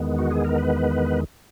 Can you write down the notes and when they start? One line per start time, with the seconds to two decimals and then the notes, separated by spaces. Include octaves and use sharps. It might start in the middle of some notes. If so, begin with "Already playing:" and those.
Already playing: E2 D#3 G#3 B3
0.18 F#4
0.31 G#4
0.44 A#4
0.58 B4